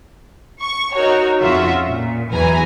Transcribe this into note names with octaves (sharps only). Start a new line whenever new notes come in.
C#6
D#4 F#4 A#4 C#5
F2 C#3 F4 F#4 E5
A#2
E2 E3 F#3 B4 G#5 A#5